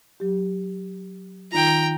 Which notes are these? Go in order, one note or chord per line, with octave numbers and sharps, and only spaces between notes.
F#3 G4
D#3 D#4 F4 G5 A#5